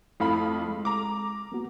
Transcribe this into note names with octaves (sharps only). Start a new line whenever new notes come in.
F2 A3 E4 F5 B5
G#3
A#5 D6
A#3 B3 F#4